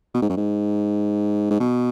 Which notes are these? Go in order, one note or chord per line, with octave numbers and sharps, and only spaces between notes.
B2
G#2
F#2
G#2
G#2
B2